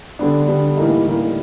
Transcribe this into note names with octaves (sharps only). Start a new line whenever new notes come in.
D3 G3 B3 D4
D3 G3 B3 D4
A2 E3 G3 A#3 D#4
A2 E3 G3 A#3 D#4